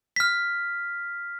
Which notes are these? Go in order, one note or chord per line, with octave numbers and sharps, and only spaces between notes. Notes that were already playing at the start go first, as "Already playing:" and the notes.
F6 B6